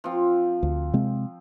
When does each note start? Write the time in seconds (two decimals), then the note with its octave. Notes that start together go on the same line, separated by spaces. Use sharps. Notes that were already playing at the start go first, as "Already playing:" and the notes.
0.04 F3 C4
0.63 D2
0.93 C3 G#3 C4